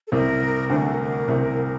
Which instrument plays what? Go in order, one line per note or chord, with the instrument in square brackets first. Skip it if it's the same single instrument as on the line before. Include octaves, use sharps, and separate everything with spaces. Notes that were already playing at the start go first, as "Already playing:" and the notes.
[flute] A4
[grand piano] C2 C3 [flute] A#4
[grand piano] D2 D3 [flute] C5
[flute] A#4
A4
A#4
[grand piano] C2 C3